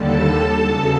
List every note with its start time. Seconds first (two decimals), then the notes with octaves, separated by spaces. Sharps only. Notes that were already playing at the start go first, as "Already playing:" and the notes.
Already playing: D#2 D3 G3 A4 A5
0.61 E2 C#3 F#3